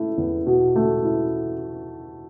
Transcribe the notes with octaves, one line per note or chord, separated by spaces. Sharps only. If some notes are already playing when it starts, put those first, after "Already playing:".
Already playing: A3 E4
E2
B2
A3
E4